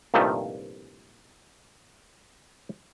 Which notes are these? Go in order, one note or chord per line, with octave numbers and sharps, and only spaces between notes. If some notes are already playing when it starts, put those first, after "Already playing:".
C2 G2 A#2 D#3 F3 A3